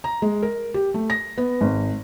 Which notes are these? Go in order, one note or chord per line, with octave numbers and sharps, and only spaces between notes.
A#5
G#3
A#4
G4
A3
A#6
B3
G#1